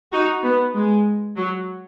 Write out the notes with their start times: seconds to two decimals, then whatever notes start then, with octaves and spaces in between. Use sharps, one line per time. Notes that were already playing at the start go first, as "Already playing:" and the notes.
0.12 D#4 F#4
0.44 B3
0.75 G#3
1.37 F#3